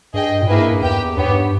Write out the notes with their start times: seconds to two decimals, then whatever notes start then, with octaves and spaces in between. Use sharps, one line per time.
0.14 G2 G#4 D#5 G5
0.42 A#2
0.48 G#2 A#3 E4 G#4 B4
0.59 G2
0.70 G2
0.82 E2 G4 B4 G5
1.16 G2 B3 G4 C#5
1.24 G#2
1.31 G2